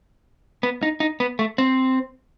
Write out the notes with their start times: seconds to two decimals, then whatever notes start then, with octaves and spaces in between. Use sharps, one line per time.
0.63 B3
0.83 D#4
1.00 D#4
1.20 B3
1.39 A3
1.58 C4